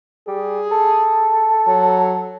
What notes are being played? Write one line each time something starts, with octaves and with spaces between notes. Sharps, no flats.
G3 G#4
A4
F#3